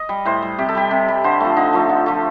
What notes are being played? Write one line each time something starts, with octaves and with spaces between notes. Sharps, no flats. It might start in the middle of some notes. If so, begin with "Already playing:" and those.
Already playing: D#5
G3
A2 C5
G3
C3 G4
A4
G3 G4
C3
G3
D3 C5
F3 A3
D3 D#4
F3 A3
D3
F3 A3